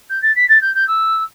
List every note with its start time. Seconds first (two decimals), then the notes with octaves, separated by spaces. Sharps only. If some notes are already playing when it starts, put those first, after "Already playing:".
0.09 G6
0.22 A6
0.35 B6
0.49 A6
0.61 G6
0.74 G6
0.87 E6